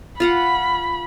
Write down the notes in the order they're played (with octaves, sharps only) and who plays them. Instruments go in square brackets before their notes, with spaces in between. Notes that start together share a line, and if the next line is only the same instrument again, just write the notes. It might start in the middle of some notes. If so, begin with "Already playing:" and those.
[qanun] F4 F5 F#5 [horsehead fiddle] B5